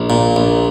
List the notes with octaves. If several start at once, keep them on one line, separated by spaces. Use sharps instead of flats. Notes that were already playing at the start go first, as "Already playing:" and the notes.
Already playing: A#1
A#2
A#1